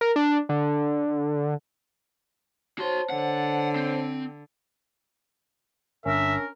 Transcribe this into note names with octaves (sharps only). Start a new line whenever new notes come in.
A#4
D4
D3
F#4 C5 C#5 A5 C6
D3 F#5
C4
G1 C#4 D4 A#4 E5